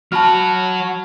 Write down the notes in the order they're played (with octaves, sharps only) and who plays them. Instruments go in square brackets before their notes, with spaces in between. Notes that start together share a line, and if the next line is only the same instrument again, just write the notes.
[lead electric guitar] F#3 F#4 [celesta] A5 B5 F6